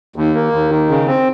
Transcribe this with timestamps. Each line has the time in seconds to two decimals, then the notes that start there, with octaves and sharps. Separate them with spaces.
0.16 D#2
0.35 A#3
0.52 D#2
0.71 D#3
0.89 C#3
1.07 C4